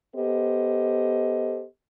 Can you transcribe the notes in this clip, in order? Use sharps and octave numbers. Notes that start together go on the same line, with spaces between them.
B3 G4 A4 C5 D#5